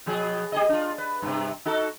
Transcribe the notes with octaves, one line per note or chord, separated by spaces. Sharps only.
B2 F3 G#4
G4 G#4 D#5
D4 F4
B4
G2 C3
D#4 F#4 A4